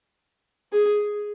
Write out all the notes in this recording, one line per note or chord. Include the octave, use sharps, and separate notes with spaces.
G#4